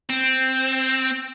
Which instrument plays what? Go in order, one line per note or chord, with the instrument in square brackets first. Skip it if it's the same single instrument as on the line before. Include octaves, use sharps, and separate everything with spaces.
[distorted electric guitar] C4